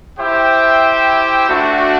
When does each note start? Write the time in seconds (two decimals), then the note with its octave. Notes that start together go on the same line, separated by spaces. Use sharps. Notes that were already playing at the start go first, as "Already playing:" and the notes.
0.18 E4 G4 C5 E5 G5
1.49 A3 D4 F#4